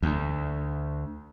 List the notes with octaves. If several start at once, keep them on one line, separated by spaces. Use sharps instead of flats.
D2